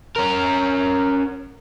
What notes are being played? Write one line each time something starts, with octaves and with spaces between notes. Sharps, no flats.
C#4 A#4